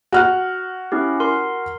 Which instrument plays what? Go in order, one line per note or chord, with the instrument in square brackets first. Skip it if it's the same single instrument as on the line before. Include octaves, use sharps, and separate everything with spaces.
[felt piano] F#4 F6 F#6
[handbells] C#4 E4 G4
A#4 C6